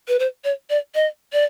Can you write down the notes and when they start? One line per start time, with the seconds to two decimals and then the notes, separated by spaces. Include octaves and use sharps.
0.08 B4
0.19 C5
0.44 C#5
0.70 D5
0.95 D#5
1.33 D5